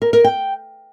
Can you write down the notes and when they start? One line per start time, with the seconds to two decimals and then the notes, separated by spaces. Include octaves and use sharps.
0.02 A#4
0.13 A#4
0.24 G5